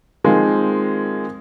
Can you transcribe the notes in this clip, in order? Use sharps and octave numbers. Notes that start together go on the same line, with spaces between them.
D#3 F3 G#3 A#3 C4